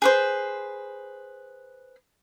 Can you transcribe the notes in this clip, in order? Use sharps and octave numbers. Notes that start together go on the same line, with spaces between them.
G#4 B4 C5